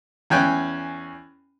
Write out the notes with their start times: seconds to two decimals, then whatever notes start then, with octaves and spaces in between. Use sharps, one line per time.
0.30 E2 C#4 G5 G#5 F#6